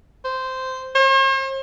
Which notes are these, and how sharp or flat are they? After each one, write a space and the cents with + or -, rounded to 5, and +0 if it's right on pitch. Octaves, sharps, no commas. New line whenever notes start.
C5 -10
C5 +45